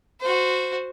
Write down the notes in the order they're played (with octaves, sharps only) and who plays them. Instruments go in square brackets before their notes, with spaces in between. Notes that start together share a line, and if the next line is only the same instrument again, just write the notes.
[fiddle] F#4 C5